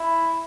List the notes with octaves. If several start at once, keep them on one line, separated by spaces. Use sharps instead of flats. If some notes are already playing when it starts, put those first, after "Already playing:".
Already playing: E4